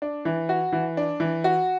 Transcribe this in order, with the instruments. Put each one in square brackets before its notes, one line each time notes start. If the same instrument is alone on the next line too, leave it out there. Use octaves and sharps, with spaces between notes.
[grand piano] D4
E3
F#4
E3
D4
E3
F#4